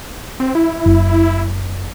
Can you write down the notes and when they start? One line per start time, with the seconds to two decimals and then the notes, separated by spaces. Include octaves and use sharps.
0.40 C4
0.55 E4
0.86 F#1